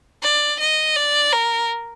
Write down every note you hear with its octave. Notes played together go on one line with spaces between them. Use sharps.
D5
D#5
D5
A#4